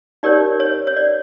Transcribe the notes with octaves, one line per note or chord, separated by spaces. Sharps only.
D#4 G4 A#4 C#5 D5
C#5
C#5
D5